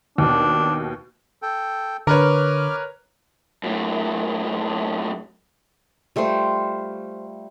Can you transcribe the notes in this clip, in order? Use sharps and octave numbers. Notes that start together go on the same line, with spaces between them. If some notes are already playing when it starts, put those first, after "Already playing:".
D#2 B2 D4
A4 G5
D3 A#4 B4 C#5 D6 F6
F#2 A2
G3 A3 F4 C5